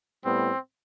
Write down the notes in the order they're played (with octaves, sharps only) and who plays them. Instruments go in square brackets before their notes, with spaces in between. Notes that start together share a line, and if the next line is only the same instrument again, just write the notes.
[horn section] A2 G3 B3 C4